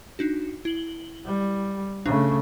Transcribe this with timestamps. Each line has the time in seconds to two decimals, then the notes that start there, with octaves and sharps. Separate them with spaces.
0.19 D4 D#4 F#4
0.65 E4 F#7 G7
1.26 G3
2.06 C#3 A3 D4